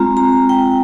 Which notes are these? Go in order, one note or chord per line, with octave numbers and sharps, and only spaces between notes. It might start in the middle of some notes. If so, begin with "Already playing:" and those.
Already playing: G#3 C4 F4 A#5
A#5
G5